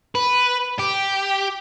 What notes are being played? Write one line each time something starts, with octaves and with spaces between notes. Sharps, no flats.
B4
G4